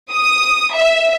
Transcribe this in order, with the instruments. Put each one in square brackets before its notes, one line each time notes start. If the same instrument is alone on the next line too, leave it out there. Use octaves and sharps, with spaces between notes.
[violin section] D#6
E5